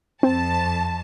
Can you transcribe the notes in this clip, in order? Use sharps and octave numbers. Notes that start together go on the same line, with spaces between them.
F2 C4 A5